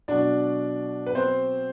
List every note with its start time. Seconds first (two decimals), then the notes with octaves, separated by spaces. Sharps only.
0.08 B2 F#3 D4 D5
1.07 B4
1.15 C4 C5